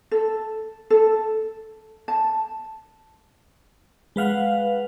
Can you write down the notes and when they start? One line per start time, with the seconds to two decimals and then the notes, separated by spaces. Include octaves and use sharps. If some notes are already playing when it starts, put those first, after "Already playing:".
0.11 A4
0.90 A4
2.08 A5
4.16 G#3 B4 F5 F#5